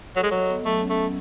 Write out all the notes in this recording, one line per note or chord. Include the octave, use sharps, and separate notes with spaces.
F#3 A4
G#3
F#3 D#5
B3
F#3 A3
C#4
A3
A4